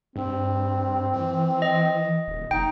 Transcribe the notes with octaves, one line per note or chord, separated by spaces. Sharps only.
G2 C4
E3
D#5
D#1
F#1 D#4 G5